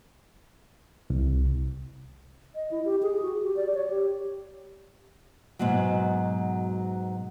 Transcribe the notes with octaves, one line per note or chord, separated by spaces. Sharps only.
C2
D#5
E4
G4
G#4
F#4
G4
D5
C#5
G4
G#2 B2 F#3